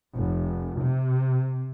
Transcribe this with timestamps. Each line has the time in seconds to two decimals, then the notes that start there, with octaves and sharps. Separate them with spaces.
0.14 F1
0.81 C3